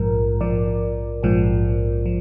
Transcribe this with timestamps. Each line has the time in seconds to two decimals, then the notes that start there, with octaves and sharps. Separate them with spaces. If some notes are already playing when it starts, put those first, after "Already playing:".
Already playing: A#1 G#2 F3 A#4
0.41 A#1 G#2 F3 D5
1.23 A#1 G#2 F3
2.06 F3